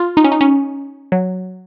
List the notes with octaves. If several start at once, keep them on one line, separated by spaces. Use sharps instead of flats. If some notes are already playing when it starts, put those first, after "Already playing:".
Already playing: F4
D#4
C#4
D#4
C#4
F#3